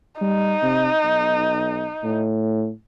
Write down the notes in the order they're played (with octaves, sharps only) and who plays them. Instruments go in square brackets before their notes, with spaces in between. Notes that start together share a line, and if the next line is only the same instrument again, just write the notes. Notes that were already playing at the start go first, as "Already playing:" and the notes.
[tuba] G3 [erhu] D#4
[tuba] C3
B1
A2